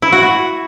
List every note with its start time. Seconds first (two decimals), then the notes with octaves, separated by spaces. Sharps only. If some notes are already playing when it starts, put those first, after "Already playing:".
0.02 E4
0.12 F#4
0.23 F#4